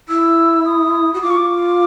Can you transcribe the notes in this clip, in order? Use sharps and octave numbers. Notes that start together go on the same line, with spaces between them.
E4 E6
D#6
F#4
F4 D6
C#6
D6